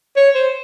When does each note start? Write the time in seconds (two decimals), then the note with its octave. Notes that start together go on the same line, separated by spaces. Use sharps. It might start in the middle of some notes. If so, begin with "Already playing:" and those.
0.16 C#5
0.35 C5